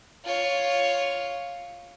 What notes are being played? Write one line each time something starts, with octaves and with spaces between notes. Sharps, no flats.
F4 C#5